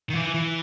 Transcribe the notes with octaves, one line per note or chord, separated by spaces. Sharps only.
D#3
E3
E3